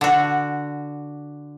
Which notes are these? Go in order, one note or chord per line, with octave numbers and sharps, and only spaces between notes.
D3 F#4